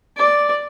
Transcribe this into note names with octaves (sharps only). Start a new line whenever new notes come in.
D5